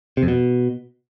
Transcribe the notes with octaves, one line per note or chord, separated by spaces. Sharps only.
C3
F2
B2